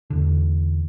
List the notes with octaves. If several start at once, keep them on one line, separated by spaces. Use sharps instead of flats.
E2 D3